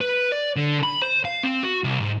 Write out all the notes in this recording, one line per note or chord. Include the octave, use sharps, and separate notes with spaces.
B4
D5
D3
B5
C5
F5
C4
F#4
C2
G#2